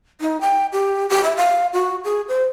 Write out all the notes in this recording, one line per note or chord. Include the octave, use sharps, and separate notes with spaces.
D#4
G5
G4
G4
E5
F5
F#4
G#4
C5